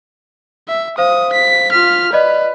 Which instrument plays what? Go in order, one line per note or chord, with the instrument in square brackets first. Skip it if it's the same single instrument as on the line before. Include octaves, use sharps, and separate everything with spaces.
[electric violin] E5
[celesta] C5 F5 [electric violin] D#6
[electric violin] B6
[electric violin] F4 F6 [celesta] B6
[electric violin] B4 [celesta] D5 D#5